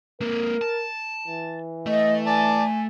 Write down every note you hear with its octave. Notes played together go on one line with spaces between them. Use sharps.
A#3 C4 A#4
A5
E3
A3 D#5
D5 G#5 A5